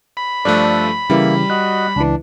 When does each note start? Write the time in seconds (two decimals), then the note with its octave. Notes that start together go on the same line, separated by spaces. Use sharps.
0.17 B5
0.45 G2 F3 A3 A4 D5 F#6
1.10 C#3 E3 G3 A#3 E4
1.50 F#4 D#5 F#6
1.96 C#2 E3 D4